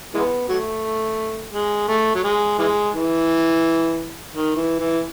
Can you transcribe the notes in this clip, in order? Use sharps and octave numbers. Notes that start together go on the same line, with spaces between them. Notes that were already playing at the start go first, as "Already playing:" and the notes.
E3 G#3 B3
F#3 A3
G#3
A3
F#3
G#3
E3 G#3
E3
D#3
E3
E3